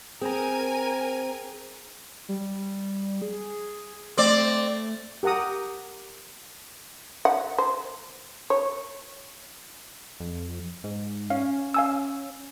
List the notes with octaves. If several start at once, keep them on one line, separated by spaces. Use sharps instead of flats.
C4 G#4 A#4 G#5 A#5
G3
G#4
A3 C4 D5
G4 A#4 F#5 A#5 D#6
F#5
C5
C#5
F2
G#2
C#4 F5
F5 G#5 E6